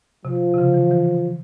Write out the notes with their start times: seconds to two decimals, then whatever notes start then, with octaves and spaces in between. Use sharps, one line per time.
0.25 C3 F3
0.54 C3
0.58 C#3
0.74 E3
0.91 E3